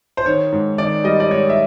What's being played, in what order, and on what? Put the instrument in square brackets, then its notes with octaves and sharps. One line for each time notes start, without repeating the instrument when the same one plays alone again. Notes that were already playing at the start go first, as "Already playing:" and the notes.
[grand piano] C5
D#3 C#5
G#2
D#3 D5
G3 D#5
D5
G#2 C#5
E5